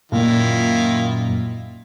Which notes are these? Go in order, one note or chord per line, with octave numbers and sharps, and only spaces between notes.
F#2 A#2 D#3 E4 F4